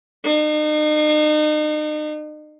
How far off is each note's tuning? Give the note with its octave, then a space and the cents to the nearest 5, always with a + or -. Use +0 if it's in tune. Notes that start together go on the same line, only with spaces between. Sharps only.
D#4 -40